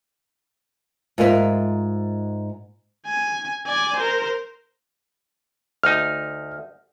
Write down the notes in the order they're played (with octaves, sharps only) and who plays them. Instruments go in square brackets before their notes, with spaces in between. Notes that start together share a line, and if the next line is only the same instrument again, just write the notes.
[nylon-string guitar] G#2 F4 A#4 B4 E5
[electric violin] G#5
D5 G#5
A#4 C5
[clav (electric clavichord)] D2 D#4 [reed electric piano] F6